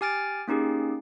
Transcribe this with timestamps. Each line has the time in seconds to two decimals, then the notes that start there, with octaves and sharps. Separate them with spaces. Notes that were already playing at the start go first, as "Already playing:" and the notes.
0.01 G4 G#5 F6 A6 D7
0.48 A#3 C#4 D#4 G4 G#4